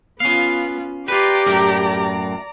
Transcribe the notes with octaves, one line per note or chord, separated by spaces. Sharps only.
B3 C#4 F4 F5
F4 G4 B4 D5 A#5
F#2 A2 A#4